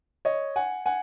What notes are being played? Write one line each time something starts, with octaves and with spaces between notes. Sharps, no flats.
C#5 D#5
F#5 G#5
F#5 G#5